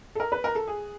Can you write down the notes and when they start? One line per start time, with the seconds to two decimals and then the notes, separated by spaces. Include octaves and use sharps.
0.15 A4
0.20 A#4
0.32 B4
0.44 A#4
0.55 A4
0.67 G#4